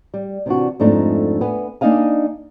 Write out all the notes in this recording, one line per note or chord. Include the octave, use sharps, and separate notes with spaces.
G3
C3 E3 D4 F#4
F2 G#2 A3 D4 D#4
B3 B4 G#5
A#3 D4 D#4 D#5 F5 G#5